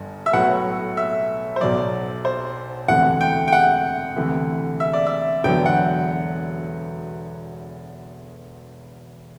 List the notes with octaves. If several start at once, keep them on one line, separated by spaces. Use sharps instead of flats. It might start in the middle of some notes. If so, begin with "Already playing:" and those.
Already playing: G1 G2
E5
B1 A2 F#3 B3 F#4 F#5
E5
C5
B1 B2 F#3 D5
C5
E1 D2 C3 E3 A3 F#5
G5
G5
F#5
D2 C3 E3 A3
E5
D5
E5
E1 E2 D3 F#3 B3 G5
F#5